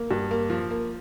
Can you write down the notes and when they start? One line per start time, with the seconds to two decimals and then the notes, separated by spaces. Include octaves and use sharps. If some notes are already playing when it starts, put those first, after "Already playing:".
Already playing: A#3
0.11 G2
0.31 A#3
0.50 F3
0.70 A#3